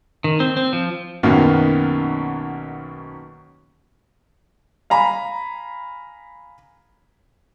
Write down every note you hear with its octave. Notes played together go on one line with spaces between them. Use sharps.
D#3
C4
C4
F3
B1 F#2 B2 D#3 A#3
F5 G#5 A#5 B5